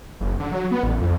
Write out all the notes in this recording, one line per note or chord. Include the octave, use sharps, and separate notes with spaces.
F#1
D3
F#3
B3
A1
F2